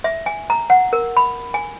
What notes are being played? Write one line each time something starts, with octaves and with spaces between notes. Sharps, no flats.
E5
G#5
A#5
F#5
A#4
B5
G#5